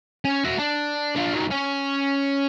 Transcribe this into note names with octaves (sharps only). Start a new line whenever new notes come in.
C#4
F#4 E5
D4
D4 F4
D#3 F#3
C#4